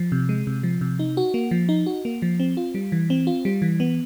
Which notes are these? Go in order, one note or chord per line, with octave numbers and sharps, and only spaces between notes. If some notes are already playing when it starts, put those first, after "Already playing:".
Already playing: F3
C3
G#3
C3
F3
C3
D#4
F#4
A#3
F3
D#4
F#4
A#3
F3
C4
F4
G3
E3
C4
F4
G3
E3
B3